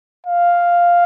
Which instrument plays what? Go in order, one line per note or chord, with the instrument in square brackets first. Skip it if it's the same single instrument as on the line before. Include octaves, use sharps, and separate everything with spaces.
[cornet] F5